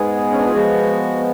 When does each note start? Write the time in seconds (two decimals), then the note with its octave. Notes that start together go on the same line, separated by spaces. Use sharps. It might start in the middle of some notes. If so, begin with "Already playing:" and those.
Already playing: G#2 G#3 B3 G#4
0.32 C#4
0.39 D4
0.47 F4
0.54 F3 G#3 B3 F#4